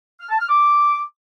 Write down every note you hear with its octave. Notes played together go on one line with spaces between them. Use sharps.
F6
A5
F6
D6